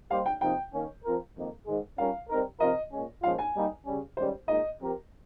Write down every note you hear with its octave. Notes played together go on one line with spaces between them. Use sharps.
G3 A#3 D#4 G4 C5 F5
G5
C3 F3 A#3 D#4 G5
D#3 A#3 C#4
F3 C4 F4 A#4
F2 D#3 A#3
G#2 D#3 G#3
G3 C#4 F4 A#4 F5
G3 C4 D#4 A#4
C3 F3 C4 F4 A#4 D#5
A#2 G#3 C#4
A#2 F3 G#3 C#4 F4 F5
G#5
G3 A#3 D#4
C#3 G3 C#4
G#2 D#3 G3 C#4 C5
A#2 G#3 D#4 D#5
F3 C4 G4 A#4